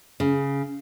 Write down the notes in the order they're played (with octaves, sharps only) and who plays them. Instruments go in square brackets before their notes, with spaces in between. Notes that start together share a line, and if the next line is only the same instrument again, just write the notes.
[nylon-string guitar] C#3